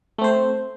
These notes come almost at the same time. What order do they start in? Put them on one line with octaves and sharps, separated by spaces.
A3 C4 C5